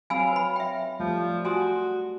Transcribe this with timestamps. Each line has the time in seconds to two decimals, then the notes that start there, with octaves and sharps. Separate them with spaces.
0.10 F#3 C4 F5 G#5 B5 E6
0.32 B4 B5
0.56 E5 G5
1.00 F3 G3 A3
1.45 F#4 G#5 C6 D#6